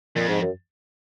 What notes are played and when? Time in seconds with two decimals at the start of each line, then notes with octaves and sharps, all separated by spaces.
0.16 F2 A#2
0.28 G#2
0.42 F#2